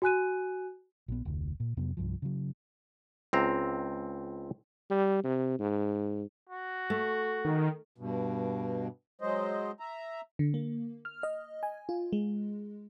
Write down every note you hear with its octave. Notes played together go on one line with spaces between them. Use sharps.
F#4 G#5 F#6 D#7
A#1 B3
F1 D2
A#2
F2 C3 F#3 B3
C2 G2 F3
C#3 F#3
C#2 C4 A#5
G3
C3
G#2
F#4
A3
D#3
G2 B2
F#3 G#3 C5 D#5
E5 A#5
D3
A#3
F6
D#5
G#5
F4
G#3